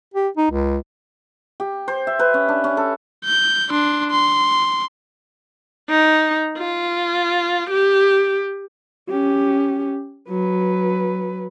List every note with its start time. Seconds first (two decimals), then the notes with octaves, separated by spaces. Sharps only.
0.14 G4
0.37 D#4
0.51 C#2
1.60 G4
1.88 C5
2.07 E5
2.19 B4
2.34 C#4
2.49 D4
2.64 C#4
2.77 A4
3.25 G6
3.70 D4 C6
4.10 C6
5.89 D#4
6.58 F4
7.70 G4
9.09 C#4 G4
10.29 F#3 B4